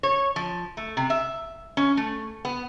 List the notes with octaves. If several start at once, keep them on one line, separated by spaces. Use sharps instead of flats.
C#5
F3
A3
C3
E5
C#4
A3
B3